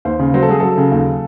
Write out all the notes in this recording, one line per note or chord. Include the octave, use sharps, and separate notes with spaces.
D#2 C5
C#3
F#3 C5
A4
F#3 G#4
F#3 A4
C#3
D#2